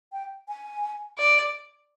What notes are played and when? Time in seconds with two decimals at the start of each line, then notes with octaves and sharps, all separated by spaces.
0.12 G5
0.48 G#5
1.19 D5